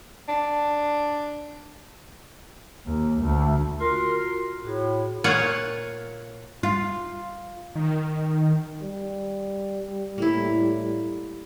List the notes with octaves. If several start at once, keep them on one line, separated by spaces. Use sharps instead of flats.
D4
D#2
D2
F4 F#4 A#4 C6
A2 F#4 G#4
A#2 F4 C#5 F#5
F4
D#3
G3
A2 A#3 E4